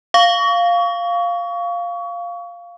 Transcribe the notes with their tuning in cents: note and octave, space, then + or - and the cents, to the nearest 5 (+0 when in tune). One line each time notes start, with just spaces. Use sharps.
F5 +0 C#6 +30